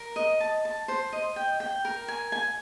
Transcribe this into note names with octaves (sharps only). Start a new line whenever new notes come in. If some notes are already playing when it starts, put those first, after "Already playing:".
Already playing: A#4
D#5
A5
A5
C5
D#5
G5
G5
A#4
G#5
G#5